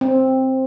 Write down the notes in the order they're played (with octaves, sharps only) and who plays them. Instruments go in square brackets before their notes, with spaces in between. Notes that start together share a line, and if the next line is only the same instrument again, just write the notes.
[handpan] C4